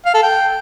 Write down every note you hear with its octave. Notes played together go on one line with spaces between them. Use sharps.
F5
A4
G5